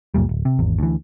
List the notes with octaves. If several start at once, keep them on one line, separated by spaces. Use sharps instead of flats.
C#2 F#2 A#2 G3
D1
C3
G#1 E2
D2 E3